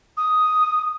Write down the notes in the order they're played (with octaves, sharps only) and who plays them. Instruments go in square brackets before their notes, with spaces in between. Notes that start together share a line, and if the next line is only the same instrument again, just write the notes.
[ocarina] D#6